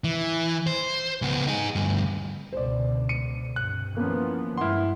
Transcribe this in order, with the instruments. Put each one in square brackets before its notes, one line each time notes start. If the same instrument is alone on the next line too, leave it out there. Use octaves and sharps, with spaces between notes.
[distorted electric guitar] E3
C5
C#2 B3
D#4 G#4
D2 G2
[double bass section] C#2 B2 D3 [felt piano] C5 D5
[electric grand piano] C#7 D#7
[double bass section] G2 C3 [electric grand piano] F#6
[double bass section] E3 F3 B3 [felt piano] A#3 C#4
[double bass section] G2 G#3 [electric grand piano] E4 C6 [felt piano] F#5 F6